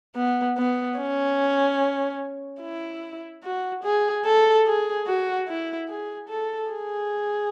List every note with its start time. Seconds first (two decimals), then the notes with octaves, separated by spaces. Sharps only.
0.16 B3
0.57 B3
0.98 C#4
2.61 E4
3.44 F#4
3.84 G#4
4.25 A4
4.67 G#4
5.07 F#4
5.48 E4
5.89 G#4
6.29 A4
6.70 G#4